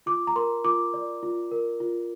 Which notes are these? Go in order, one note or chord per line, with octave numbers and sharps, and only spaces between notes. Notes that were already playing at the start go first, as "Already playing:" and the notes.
F4 D6
A#5
A#4 C6
F4 D6
D5
F4
A#4
F4